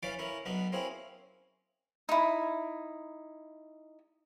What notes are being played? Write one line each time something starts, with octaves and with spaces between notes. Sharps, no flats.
E3 C#4 D5 F5 D6
C#4 E4 A#4
B1 B3 D4 D#4
A#3 C4 C#4 E4 G#4
D#4 E4